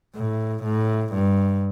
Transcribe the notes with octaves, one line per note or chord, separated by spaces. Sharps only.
A2
A2
G2